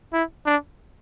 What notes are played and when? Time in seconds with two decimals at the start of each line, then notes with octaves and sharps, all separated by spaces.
0.13 E4
0.46 D4